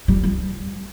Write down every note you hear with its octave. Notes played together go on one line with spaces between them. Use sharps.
G3
G3